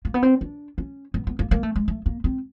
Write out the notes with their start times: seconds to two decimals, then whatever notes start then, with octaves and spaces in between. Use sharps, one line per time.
0.05 A#3
0.14 B3
0.23 C4
0.41 D4
0.78 C#4
1.14 B3
1.27 B3
1.39 A#3
1.51 A#3
1.63 A3
1.76 G#3
1.88 A3
2.06 A#3
2.24 C4